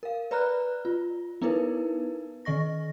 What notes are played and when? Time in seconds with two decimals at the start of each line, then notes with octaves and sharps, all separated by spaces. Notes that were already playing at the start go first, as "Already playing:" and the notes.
0.03 A#4 F5
0.31 B4 D5 A#5 B5 F6 F#6
0.85 F4
1.42 B3 D#4 E4 A#4 B4
2.45 D#3 D#5 C#6 A#6